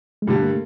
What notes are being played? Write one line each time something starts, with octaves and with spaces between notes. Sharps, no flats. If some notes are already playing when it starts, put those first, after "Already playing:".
G#3
G2 D3 G3 A3
A#3